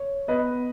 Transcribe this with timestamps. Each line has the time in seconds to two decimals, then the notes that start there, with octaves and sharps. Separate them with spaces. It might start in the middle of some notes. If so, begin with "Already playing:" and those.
Already playing: C#5
0.28 B3 B4 D#5